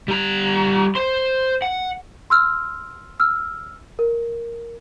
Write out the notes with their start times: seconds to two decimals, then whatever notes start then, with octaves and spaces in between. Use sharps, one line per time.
0.08 G3 A#5
0.95 C5 C6
1.62 F#5
2.30 C6 E6 F6
3.20 E6 F6
3.99 A#4